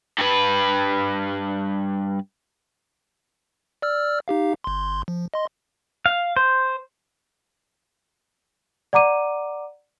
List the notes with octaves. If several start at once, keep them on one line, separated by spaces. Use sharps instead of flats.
G2 B4
D5 E6 F6
D#4 G4 F5
G1 C6
F3
D#5 C6
F5
C5
D5 F#5 A#5 D6 D#7